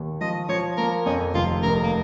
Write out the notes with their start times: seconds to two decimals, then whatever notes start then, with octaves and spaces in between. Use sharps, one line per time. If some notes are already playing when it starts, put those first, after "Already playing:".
Already playing: D#2
0.21 F3 D#5
0.49 F3 C#5
0.78 A#3 A#4
1.06 F2 C#4
1.34 F1 F4
1.63 F1 A#4
1.84 A#3